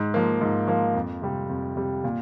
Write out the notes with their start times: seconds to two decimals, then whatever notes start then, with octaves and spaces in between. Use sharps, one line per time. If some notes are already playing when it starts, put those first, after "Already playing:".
Already playing: G#2
0.14 F3 A#3
0.41 G#2
0.68 F3 A#3
0.94 F2
1.22 C3 G3
1.49 F2
1.76 C3 G3
2.04 A#2